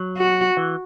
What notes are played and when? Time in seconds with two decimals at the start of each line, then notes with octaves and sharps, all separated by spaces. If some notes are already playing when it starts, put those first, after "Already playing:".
Already playing: F#3
0.17 F#4
0.57 E3